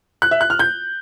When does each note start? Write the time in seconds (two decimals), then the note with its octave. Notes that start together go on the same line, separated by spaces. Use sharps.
0.22 F#6
0.31 E5
0.41 F#6
0.50 F6
0.59 G6